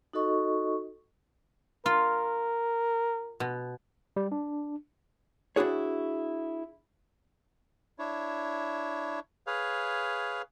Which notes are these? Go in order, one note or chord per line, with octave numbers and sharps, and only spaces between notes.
D#4 F#4 A4 D#5 C#6
F4 A#4
B2
G3
D4
D4 E4 F#4 G#4 C#5
D4 E4 C#5
G#4 B4 C#5 F5